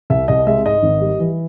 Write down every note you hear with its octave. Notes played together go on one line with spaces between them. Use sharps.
C2 E5
C2 D#5
G#3 E5
G#2 D#5
G#1
G3
E3